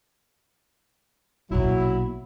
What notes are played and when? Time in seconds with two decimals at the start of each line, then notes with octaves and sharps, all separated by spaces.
1.51 A#1 B2 F#3 E4